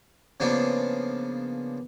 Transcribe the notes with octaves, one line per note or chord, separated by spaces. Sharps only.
C#3 F3 A#3 B3 D4